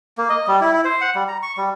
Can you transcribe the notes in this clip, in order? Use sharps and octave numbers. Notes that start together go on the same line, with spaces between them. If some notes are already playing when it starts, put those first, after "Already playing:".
A#3
D#5
G3
E4
E4
C5
F#5
G3
A#5
C#6
G3